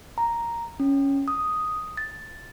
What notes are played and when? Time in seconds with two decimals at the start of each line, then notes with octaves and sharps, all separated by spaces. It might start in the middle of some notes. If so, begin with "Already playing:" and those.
0.18 A#5
0.80 C#4
1.28 D#6
1.97 A6